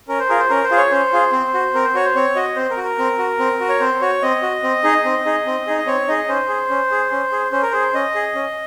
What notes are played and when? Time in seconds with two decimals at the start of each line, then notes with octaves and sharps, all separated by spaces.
0.08 C#4 A#4
0.20 C5
0.29 F4 G#4 A#4
0.40 C5
0.50 C#4 A#4
0.64 C5
0.71 F4 G#4
0.77 C#5
0.91 C#4 C5
1.13 F4 G#4
1.32 C4
1.54 F#4
1.74 C4 A#4
1.85 C5
1.94 F#4 C#5
2.05 C5
2.16 C4 C#5
2.36 F#4 D#5
2.56 C4 C5
2.70 A#4
2.77 F#4
2.84 A#4
2.98 C4
3.18 F#4
3.39 C4
3.60 F#4
3.69 C#5
3.80 C4 C5
4.01 F#4 C#5
4.22 C4 D#5
4.42 F#4
4.63 C4
4.84 D#4 G#4
5.05 C4
5.26 D#4 G#4
5.46 C4
5.67 D#4 G#4
5.79 D#5
5.87 C4 C#5
6.08 D#4 G#4 D#5
6.28 C#4 C5
6.49 G#4
6.70 C#4
6.91 G#4
7.12 C#4
7.32 G#4
7.52 C#4 C5
7.62 A#4
7.71 G#4 C5
7.93 C#4 D#5
8.15 G#4
8.35 C#4